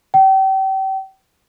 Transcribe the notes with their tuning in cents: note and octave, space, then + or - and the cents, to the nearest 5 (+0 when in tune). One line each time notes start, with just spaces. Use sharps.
G5 -35